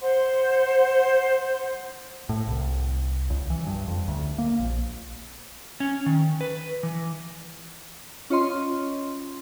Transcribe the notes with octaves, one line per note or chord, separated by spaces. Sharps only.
C5 F#5 C6
A2
C2
C#2
E3
G2
F2
D2
A#3
A#1
C#4
D#3
B4
E3
C#4 F4 C#5 D#5 C6